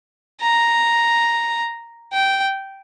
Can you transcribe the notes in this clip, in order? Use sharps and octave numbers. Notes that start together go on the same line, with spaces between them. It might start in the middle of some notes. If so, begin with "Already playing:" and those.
A#5
G5